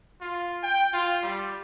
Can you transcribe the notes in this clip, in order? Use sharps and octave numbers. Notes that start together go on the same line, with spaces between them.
F4
G5
F4
G3